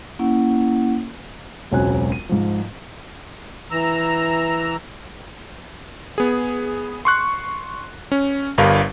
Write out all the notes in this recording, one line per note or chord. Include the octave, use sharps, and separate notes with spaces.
A#3 C#4 E4 F#5
E1 C#2 F#3 C4 G#5 F#6
D#7
G#2 F3
E3 A#5 E6
B3 G#4
C6 C#6 F#6
C#4
G1 G2 A#4 F5